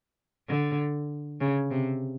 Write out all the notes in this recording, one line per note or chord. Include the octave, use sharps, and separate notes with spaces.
D3
C#3
C3